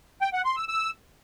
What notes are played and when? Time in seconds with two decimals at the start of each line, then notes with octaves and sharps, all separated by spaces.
0.22 G5
0.33 F#5
0.45 C6
0.57 E6
0.68 E6